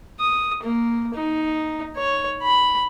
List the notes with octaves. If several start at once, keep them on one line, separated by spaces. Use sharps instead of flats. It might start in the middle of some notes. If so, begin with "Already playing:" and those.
D#6
A#3
D#4
C#5
B5